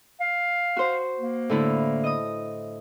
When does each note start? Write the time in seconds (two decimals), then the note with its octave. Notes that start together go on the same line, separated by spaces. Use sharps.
0.20 F5
0.77 F#4 C5
1.20 A#3
1.50 A2 D3 E4
2.04 D#5 D#6